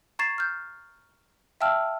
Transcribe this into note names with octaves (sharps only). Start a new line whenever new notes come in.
A#5 C#6 G#6 A6 C7 E7
F6 G6
E5 F5 G5 A5 E6 F6